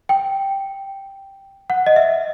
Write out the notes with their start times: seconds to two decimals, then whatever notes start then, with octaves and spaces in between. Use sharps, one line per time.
0.09 G5
1.70 F#5
1.86 D#5
1.96 E5